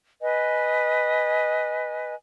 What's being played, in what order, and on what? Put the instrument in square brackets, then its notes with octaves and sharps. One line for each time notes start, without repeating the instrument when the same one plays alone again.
[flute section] B4 D#5 G#5